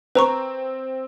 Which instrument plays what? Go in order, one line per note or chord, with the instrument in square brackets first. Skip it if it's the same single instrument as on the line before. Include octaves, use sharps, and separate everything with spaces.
[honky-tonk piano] C4 [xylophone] B4 A#5 C#6